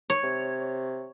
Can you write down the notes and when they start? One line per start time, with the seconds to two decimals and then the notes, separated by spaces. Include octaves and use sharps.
0.10 C#5
0.24 C3